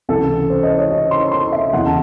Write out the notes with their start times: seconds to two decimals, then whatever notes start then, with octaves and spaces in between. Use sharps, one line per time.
0.09 C#2 C3 E3 A4
0.50 C5
0.63 D#5
0.77 C#5
0.91 D#5
1.11 C6
1.32 C6
1.52 E5
1.73 E2 C#3 E3 F#5
1.86 A5